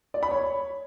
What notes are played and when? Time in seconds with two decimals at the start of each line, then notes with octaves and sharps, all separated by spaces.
0.14 D5
0.23 B5
0.31 C#5